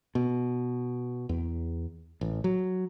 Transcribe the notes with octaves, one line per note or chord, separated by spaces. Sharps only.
B2
E2
A1
F#3